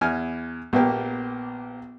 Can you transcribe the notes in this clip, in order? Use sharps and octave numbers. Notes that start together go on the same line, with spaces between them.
E2 G#5 F6
A#1 A#3 B3 G4